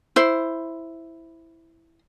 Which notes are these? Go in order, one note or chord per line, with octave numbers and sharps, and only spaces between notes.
E4 C5